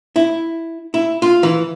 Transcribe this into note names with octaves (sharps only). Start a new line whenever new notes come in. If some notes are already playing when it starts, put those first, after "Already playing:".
E4
E4
F4
E3